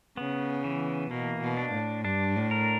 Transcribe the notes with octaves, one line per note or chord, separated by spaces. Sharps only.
C#3 B3
E3
B2 A#3
B2
D4
A2
G2 D4
A2
A#4